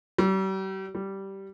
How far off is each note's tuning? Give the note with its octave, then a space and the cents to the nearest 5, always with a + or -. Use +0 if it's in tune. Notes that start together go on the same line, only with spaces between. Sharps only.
G3 -40
G3 -10